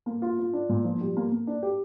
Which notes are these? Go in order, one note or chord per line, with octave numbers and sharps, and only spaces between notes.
A#3
F4
F4
D4
A#2
F3
G3
A#3
A#3
D4
G4